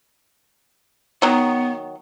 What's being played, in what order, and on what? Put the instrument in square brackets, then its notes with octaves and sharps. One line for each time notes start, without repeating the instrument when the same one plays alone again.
[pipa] D#3 F#3 [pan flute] B3